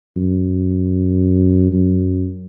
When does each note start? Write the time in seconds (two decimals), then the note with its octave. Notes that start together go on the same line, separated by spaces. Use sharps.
0.17 F#2
1.73 F#2